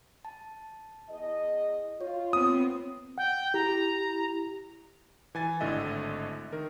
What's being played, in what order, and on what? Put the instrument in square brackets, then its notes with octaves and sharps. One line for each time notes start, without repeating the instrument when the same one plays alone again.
[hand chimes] A5
[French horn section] E2 D#5
[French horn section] F4 [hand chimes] C#5
[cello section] B3 C4 [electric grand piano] D#6
[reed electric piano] F#5 [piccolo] G5
[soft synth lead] E4 [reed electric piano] G4 [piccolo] A#5
[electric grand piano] E3 G#5 A6
G#1 A2 D3 A3 D#5 E5
D#3 A#4